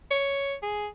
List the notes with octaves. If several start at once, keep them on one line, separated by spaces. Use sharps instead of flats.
C#5
G#4